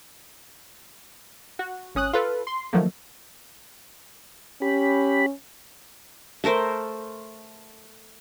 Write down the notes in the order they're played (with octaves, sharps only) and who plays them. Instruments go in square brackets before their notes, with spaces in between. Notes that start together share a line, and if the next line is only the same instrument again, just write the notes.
[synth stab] F#4
G#1 C#4 D#6 F#6
F4 A4 B4
C6
D#3 F3 F#3 A3 A#3
[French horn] C#4 [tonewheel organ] G4 B5
[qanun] A3 A4 A#4 C5